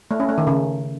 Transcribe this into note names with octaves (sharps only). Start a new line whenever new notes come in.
A3
C#4
A3
D#3
C#3